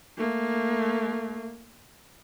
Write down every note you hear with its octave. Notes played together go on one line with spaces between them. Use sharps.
A3 A#3